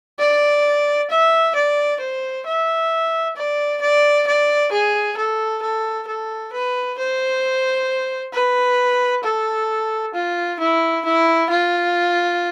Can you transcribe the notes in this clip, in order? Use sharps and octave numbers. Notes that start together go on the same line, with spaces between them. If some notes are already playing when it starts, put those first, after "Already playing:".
D5
E5
D5
C5
E5
D5
D5
D5
G#4
A4
A4
A4
B4
C5
B4
A4
F4
E4
E4
F4